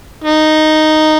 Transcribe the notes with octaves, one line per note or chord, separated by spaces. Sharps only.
D#4